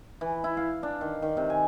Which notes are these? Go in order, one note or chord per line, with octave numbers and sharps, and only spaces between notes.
E3
E4
F5
D4
D#3
D#3
C3
G#5